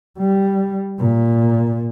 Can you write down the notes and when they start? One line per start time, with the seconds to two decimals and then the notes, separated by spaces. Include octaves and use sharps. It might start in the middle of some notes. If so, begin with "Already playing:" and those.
0.18 G3
0.99 A#2